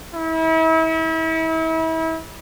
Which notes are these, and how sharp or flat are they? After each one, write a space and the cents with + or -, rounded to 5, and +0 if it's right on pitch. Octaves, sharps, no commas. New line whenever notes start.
E4 -35